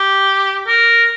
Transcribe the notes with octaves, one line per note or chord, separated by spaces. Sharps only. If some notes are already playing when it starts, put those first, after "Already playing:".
Already playing: G4
A#4